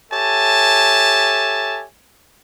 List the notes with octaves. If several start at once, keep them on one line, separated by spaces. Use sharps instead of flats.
G4 A4 C#5 E5 G#5 A5